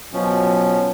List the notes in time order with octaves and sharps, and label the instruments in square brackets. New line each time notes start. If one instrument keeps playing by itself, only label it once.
[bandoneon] B2 F3 C#4 [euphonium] F#3